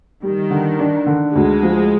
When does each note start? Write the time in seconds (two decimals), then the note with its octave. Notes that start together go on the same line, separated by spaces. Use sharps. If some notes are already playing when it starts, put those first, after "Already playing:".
0.23 D#3 G3
0.50 D3
0.79 D4
1.06 D3
1.34 D2 G#3
1.63 F3